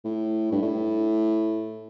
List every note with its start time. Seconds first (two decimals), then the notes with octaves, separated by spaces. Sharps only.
0.04 A2
0.52 G2
0.62 A2